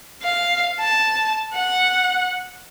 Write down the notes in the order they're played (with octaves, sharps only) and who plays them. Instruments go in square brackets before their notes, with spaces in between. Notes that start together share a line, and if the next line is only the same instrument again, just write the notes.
[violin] F5
A5
F#5